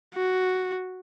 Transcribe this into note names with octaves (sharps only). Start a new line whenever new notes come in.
F#4